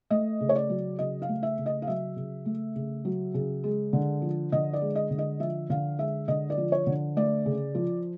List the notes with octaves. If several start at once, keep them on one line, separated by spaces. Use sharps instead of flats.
A3 D#5
C#3
C#5
D5
F#3
C#3 D#5
F5
A3
E5
C#3
D#5
F5
F#3 E5
C#3
A3
C#3
F#3
C#3
G#3
D3
F3
D3 D#5
D5
G#3
D#5
D3
D#5
F3 E5
D3 F5
G#3 E5
D3 D#5
D5
F3
C#5
D3
A3 D5
C#3
F3